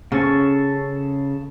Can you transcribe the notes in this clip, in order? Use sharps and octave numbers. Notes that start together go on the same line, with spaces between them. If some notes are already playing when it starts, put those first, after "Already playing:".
C#3 C#4 A4 C#6